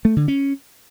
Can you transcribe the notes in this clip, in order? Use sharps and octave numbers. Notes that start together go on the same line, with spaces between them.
A3
D3
C#4